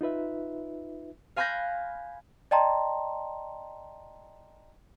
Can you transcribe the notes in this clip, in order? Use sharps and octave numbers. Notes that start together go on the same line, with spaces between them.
D#4 F4 B4 E5
F5 G#5 B5 F#6 G6 A#6
D5 D#5 G5 A5 A#5 C6